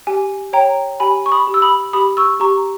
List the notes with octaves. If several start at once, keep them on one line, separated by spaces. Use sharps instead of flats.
G4 G#5
C#5 G5 A#5
G4 G#5 B5
C#6
B5 D#6
G4
E6
B5 D#6
G4 B5 D#6
C#6 E6
G4 A#5 C#6